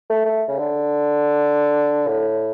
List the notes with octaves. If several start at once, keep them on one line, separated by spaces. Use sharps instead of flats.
A3
A3
C#3
D3
A2